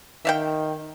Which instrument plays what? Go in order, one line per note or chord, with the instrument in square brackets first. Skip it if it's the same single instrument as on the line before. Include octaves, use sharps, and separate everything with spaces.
[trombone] D#3 [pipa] E5 F5 G5